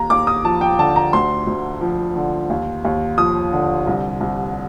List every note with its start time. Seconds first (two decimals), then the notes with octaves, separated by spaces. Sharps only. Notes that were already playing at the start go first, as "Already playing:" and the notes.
Already playing: D#2 A#5
0.10 D#2 D6
0.27 D#6
0.44 F3 A5
0.61 G5
0.78 D3 A5
0.96 A#5
1.13 D2 C6
1.47 D2
1.81 F3
2.16 D3
2.50 D#2
2.85 D#2
3.18 F3 D#6
3.52 D3
3.87 C2
4.21 C2